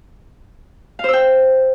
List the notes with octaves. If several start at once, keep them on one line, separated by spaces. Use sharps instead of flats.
C5 F5 G5 E6